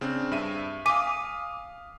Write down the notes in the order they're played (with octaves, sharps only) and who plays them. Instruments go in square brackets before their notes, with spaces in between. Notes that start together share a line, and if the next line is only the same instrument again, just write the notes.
[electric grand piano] C#3 C4 D4
G2 E5 D#7
[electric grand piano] F5 D#6 B6 [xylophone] G#5 D6 D#7